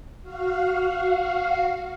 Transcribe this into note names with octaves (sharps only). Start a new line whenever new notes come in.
F#4 F5